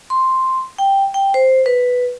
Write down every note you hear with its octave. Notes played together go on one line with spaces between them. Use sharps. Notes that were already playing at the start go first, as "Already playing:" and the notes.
C6
G5
G5
C5
B4